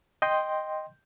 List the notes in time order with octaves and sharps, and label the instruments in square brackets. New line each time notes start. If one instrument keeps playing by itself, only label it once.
[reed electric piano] D#5 G5 C6